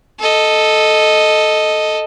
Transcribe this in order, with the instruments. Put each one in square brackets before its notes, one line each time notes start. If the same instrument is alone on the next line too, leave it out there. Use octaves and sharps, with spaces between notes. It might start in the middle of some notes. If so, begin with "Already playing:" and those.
[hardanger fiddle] A4 D#5